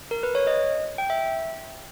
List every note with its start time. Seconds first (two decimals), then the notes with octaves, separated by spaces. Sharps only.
0.11 A#4
0.23 B4
0.35 C#5
0.47 D#5
0.98 G5
1.10 E5